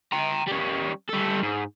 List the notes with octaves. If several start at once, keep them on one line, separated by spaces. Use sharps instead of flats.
G5 A#5
G3 C#4
G3 A4
G#2